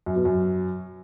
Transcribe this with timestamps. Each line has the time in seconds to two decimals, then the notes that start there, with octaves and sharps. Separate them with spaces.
0.06 F#2
0.16 B2
0.25 F#2